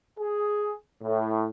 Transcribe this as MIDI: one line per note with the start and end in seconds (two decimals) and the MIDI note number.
0.19 0.74 68
1.03 1.48 45